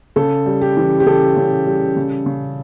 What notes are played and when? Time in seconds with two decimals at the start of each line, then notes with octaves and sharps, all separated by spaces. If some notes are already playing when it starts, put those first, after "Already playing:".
0.16 C#3 A4
0.46 G3
0.61 G4
0.77 E3
1.00 G4
1.06 C#3 A4
1.36 C#3
1.66 G3
1.97 C#3
2.26 C#3